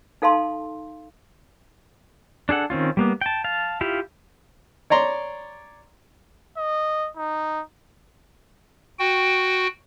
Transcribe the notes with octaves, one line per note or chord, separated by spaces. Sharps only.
D#4 A4 F5 A5 C6
D4 G#4 A4 F#5
D#3 C4 C#4 F4
G3 A#3 B3
G5 A5
F5 A5
E4 F4 G4 F5
C#5 D5 A#5 C6
D#5
D#4
F#4 G5